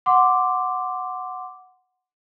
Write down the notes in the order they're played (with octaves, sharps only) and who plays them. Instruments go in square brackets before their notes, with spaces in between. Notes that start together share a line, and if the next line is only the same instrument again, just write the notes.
[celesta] F#5 C6 D6